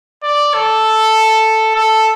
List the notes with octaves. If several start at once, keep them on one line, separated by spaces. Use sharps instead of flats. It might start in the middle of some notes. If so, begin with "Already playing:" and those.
D5
A4
A4